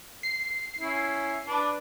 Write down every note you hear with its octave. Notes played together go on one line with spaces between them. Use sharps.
C7
C#4 E4
D4 B4 D5